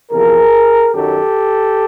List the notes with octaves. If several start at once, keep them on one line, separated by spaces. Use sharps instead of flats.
E2 C3 F3 G#4 A#4
F#2 D#3 F#3 G4 A4